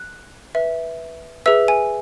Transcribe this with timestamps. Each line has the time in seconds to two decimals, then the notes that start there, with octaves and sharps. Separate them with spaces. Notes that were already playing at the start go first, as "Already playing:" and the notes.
Already playing: F#6
0.55 B4 E5
1.46 G#4 B4 E5 E6
1.68 G#5